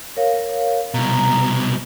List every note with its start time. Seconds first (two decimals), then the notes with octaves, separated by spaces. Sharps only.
0.17 A#4 C#5 F5
0.94 C2 B2 A#5